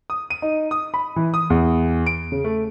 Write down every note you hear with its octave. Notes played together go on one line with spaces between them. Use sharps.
D#6
D#7
D#4
D#6
B5
E3
D#6
E2
D7
C#3
A3